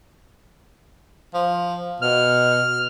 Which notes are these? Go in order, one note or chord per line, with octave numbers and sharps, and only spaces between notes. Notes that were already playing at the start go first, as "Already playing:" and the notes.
F3
B2 F6